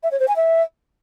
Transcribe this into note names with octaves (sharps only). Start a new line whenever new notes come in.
E5
C#5
C5
G#5
E5